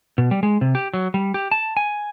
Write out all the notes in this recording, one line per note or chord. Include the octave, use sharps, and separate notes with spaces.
B2
G3
G#3
C3
G4
F#3
G3
G4
A5
G#5